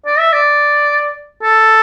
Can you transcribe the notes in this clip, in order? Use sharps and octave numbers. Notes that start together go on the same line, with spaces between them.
D5
E5
D5
A4